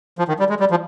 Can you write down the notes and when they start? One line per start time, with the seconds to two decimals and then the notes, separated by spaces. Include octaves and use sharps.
0.19 F3
0.28 D#3
0.39 G3
0.50 G#3
0.60 G3
0.71 F3